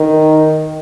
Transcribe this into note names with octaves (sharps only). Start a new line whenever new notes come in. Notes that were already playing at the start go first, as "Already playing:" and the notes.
Already playing: D#3